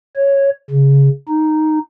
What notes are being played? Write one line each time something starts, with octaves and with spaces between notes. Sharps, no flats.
C#5
C#3
D#4